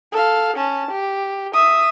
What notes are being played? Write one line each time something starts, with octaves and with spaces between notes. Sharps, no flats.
A4 F5
C#4 A5
G4
E5 D#6